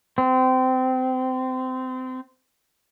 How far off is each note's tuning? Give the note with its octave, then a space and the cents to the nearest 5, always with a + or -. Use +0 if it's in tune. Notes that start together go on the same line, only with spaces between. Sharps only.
C4 -25